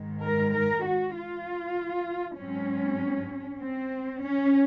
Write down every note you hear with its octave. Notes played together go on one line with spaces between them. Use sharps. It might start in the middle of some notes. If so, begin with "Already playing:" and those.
Already playing: G#2 D#3 G#3
A#4
A#4
F#4
F4
G#2 F#3 C4 C#4
C4
C#4